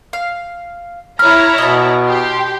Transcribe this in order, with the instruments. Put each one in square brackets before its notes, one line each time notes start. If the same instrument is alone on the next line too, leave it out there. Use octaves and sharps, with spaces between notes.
[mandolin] F5
[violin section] E4 C#5 A#5 [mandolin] B5 [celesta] F6
[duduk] B2 [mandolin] D#5 A5
[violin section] G4 C6